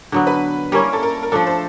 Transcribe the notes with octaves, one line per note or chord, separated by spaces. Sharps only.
D3 F#3 B3
B4
G3 A#3 C#4 E4 A#4
A4
A#4
A#4
F3 A3 D4 A4
C5